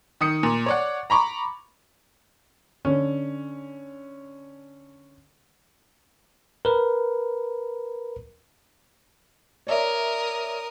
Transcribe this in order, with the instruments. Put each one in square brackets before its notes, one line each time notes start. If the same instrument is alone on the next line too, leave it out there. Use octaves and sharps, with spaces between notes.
[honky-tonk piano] D#3 D#6 C#7
A#2
C#5 D5 F#5
A#5 B5 C#6 D6
[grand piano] D3 C#4
[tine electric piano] A#4 B4
[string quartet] A#4 D#6 [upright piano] C#5 D5 E5